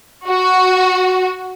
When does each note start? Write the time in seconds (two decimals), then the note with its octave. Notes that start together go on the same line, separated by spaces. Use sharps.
0.27 F#4